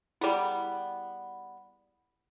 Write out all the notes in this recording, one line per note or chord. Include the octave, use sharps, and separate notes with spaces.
G3 B3 E4 G#4